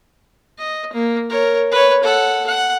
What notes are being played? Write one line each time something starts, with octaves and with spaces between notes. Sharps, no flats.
D#5
A#3
A#4 C#5
B4 C#5
A4 F#5
F#5